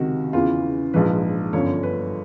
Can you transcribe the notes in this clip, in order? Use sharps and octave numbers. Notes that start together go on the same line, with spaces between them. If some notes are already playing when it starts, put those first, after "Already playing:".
Already playing: C#2 C3 D#3 F#4
E2 C#3 E3 F4
A#1 G#2 F3 B4
G1 F#2 D3 F3 C#5
B4